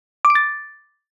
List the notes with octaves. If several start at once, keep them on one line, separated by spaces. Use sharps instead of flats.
D6
D7
A6